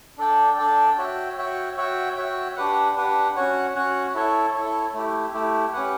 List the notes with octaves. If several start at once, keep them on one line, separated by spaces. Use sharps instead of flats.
D4 A4 D5 G5
D4 A4 D5 G5
F#4 C#5 E5 G5
F#4 C#5 E5 G5
F#4 C#5 E5 G5
F#4 C#5 E5 G5
D4 G4 B4 F#5
D4 G4 B4 F#5
C#4 F#4 C#5 F#5
C#4 F#4 C#5 F#5
E4 A4 C#5
E4 A4 C#5
A3 E4 G4
A3 E4 G4
C#4 G4 B4 F#5